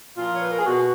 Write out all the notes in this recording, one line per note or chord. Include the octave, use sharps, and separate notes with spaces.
A#2 F3 F4
C#5
B4
A#4
G#4
B2 F#4